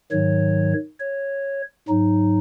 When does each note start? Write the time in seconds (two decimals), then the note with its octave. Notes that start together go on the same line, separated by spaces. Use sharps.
0.11 G#2 D#3 F#3 C#5
1.00 C#5
1.88 G#2 F#3 D#4